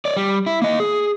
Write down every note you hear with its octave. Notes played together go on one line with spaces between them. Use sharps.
C#5 D5
G3
E4
A#3 D#5
G#4